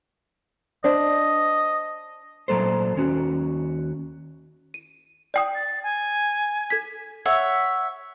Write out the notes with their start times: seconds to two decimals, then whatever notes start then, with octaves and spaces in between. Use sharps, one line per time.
0.84 D4 C5 D#5
2.48 A#2 F#3 A#3 A4 C5
2.96 D#2 C#4 F#4
4.74 D#7
5.34 D5 G5 D#6
5.55 A6
5.83 G#5
6.70 A4 G#6 B6
7.26 C#5 E5 F#5